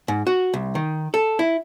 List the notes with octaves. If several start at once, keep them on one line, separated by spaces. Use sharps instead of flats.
G#2
F#4
C2
D#3
A4
E4